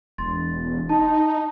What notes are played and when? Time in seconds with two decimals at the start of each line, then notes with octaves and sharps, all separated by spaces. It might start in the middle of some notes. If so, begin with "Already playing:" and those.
0.18 E1 C6 A6
0.89 D#4 A5